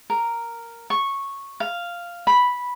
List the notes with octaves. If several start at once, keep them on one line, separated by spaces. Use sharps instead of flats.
A#4
C#6
F5
B5